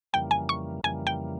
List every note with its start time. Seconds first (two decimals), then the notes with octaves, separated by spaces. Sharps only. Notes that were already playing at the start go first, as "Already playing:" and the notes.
0.13 F2 C#3 E3 G3 A#3 G5
0.31 G#5
0.49 C#6
0.84 F2 C#3 E3 G3 A#3 G#5
1.07 G5